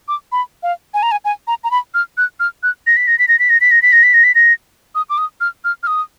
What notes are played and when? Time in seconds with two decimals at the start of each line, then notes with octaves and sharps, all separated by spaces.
0.08 D6
0.32 B5
0.63 F5
0.94 G#5
1.03 A#5
1.12 G#5
1.25 G#5
1.47 A#5
1.64 A#5
1.71 B5
1.94 F6
2.17 F#6
2.40 F6
2.63 F#6
2.87 A#6
2.97 B6
3.07 A#6
3.19 B6
3.28 A#6
3.39 B6
3.50 A#6
3.61 B6
3.71 A#6
3.82 B6
3.92 A#6
4.03 B6
4.14 A#6
4.24 B6
4.35 A#6
4.95 D#6
5.10 D6
5.18 D#6
5.41 F6
5.64 F6
5.83 F6
5.87 D#6